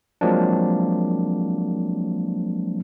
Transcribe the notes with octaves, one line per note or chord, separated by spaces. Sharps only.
F3 F#3 G#3 A#3 C4 D4